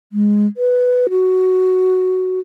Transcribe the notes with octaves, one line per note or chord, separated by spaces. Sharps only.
G#3
B4
F#4